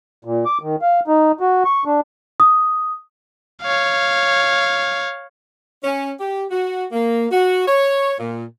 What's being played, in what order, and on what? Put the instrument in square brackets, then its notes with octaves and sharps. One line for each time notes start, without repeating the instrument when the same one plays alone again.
[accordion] A#2
D6
D#3
F5
D#4
F#4
C#6
D4
[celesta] D#6
[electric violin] C#5 F5
[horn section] C#4
G4
F#4
A#3
F#4
C#5
A#2